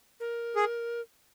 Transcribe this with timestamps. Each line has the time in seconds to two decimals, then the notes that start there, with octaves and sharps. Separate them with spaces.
0.20 A#4
0.56 G#4